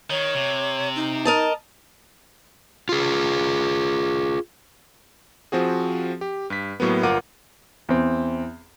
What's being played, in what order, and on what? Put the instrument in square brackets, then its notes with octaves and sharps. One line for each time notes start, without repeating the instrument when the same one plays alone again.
[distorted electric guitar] D#3 [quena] C#5
[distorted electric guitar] C3
[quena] D#4
[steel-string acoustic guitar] A#4 D#5 A5
[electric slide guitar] F4 G#4
[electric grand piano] F3 C4 F#4 G#4
G4
G2 B6
A2 F#3 A#3 B3
G1 F4 A#4 F#5 D6 D#7
[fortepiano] E2 C4